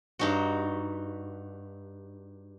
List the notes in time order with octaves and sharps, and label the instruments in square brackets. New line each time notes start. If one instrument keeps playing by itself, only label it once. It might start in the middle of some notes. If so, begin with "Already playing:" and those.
[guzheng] G2 D#4 F#4